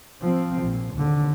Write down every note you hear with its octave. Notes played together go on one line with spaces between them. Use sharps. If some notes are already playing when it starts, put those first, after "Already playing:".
F3 C4
A#1
D#2 D3